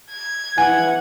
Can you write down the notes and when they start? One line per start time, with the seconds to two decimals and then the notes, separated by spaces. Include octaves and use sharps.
0.11 G#6
0.58 E3 F#5 G#5